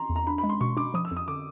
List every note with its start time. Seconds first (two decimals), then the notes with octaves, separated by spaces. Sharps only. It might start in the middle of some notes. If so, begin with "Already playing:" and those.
Already playing: A#5 C6
0.09 E2
0.16 A#5
0.27 D4 B5
0.38 B5
0.43 G#3
0.49 C6
0.61 B2 C#6
0.77 D4 D6
0.94 F3 D#6
1.05 E6
1.11 F2
1.17 D#6
1.28 D3 D6